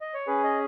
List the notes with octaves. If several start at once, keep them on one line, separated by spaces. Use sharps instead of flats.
D#5
C#5
C#4 G#4 B4
D#5